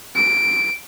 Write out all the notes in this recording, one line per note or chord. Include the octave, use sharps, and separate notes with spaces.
D7